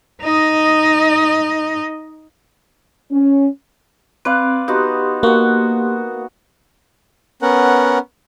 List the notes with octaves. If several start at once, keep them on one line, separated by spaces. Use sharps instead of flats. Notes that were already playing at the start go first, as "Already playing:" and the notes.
D#4 D#5
C#4
C4 B4 D5 F5
B3 D#4 F#4 G4 C6
A#3 F#4 F#5
B3 C#4 A#4 F#5